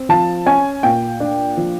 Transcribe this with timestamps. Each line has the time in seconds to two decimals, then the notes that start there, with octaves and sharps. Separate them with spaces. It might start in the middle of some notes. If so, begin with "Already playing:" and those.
Already playing: C4
0.09 F3 A5
0.46 C#4 G#5
0.83 A#2 G5
1.20 D4
1.57 F3